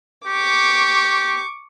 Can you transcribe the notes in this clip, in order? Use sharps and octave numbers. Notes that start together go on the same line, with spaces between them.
G4 C#6 D6